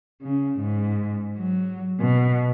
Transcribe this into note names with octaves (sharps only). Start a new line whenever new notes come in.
C#3
G#2
F#3
B2